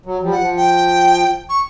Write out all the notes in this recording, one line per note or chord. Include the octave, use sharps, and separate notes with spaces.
F#3
F3 G3
F#5
F3
G5
C#6